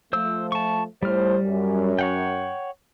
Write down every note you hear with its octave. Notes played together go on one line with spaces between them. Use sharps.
F3 A3 C5 E6
A5 C#6
A2 G3 C5 F6
F#2
C#5 F#5 G5